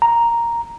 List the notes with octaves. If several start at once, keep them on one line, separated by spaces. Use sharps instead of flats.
A#5